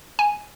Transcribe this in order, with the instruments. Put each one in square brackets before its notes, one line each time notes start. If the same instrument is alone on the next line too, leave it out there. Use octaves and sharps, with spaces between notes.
[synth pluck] G#5